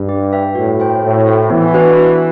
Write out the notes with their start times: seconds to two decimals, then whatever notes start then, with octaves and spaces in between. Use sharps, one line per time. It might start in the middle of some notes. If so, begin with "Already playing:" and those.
Already playing: G2
0.09 G4
0.32 B4 E5 G5
0.55 A2 F#4
0.80 C5 G5
1.04 A2 F#4
1.27 C5 G5
1.50 E3 B3
1.74 D4 F#4 B4
1.99 B3